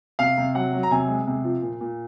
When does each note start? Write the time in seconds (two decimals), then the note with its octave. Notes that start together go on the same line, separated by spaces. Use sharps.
0.19 C3 F5
0.38 C3
0.54 F#3 F#5
0.73 F#3
0.83 A#5
0.91 C3 G#5
1.08 G#3
1.27 C3
1.44 F3
1.62 A#2
1.81 A#2